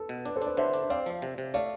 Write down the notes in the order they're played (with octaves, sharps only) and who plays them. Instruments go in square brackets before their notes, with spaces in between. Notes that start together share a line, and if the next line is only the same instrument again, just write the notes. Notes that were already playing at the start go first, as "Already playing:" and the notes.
Already playing: [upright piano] A4 B4
[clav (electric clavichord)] B2
[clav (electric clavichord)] D4 [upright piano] B4
[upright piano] A4 C5
[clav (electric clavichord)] D4 [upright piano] B4 D5
[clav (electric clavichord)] D3 [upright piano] C5 E5
[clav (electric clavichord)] D4
[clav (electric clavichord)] C4 [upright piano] D5 F5
[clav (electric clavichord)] F3
C3
C3
[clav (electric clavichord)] A3 [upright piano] D5 F5